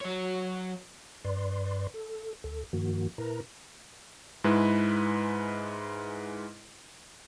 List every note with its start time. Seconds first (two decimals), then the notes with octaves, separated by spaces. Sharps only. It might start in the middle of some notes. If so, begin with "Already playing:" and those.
0.01 F#3 C#5
1.25 G2 B4 D5 C6
1.94 A4
2.44 D2 A4
2.73 G2 D#3 F3 A#3 F#4
3.18 A#2 E4 A#4 B4 A#5
4.44 G#2 G#3 E4 B4